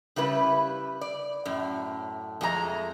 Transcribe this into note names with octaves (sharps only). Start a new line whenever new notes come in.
C#3 G3 E4 B4
D5
F#2 A2
F2 G#3 A3 F#4 A#5